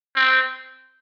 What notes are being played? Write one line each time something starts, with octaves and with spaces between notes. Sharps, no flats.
C4